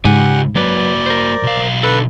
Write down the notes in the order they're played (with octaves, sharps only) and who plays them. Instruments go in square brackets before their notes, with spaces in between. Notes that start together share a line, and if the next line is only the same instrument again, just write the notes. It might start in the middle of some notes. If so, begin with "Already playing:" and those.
[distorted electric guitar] C#2 [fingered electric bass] G#2 [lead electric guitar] G4 G#5 [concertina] F#5
[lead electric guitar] F#3 B4 [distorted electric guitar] A#3 F#4 [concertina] D5
[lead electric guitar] A#4 C5
[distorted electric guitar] B1 F5
[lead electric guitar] D3 A4 [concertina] B4